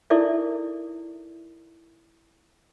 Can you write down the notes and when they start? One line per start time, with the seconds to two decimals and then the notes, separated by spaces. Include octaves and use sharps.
0.10 D#4 E4 A4 A#4 D5 E5